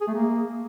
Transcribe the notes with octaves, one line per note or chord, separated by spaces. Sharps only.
G#4
A3
A#3